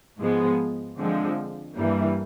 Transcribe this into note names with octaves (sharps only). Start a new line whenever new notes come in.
G#2 F3 G#3 B3
D3 F3 G#3 C4
G2 E3 G3 A#3